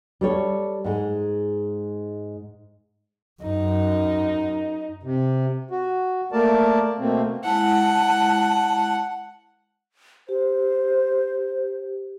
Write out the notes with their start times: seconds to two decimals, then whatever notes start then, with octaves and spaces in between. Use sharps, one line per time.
0.21 G3 A4 C#5
0.84 G#2 G#3
3.42 F#2 D#4
5.03 C3
5.71 F#4
6.32 A3 A#3 A#4 D5 A5
6.99 B2 A3 A#3 C4
7.45 G#3 E4 F#5 A5
10.29 G4 C5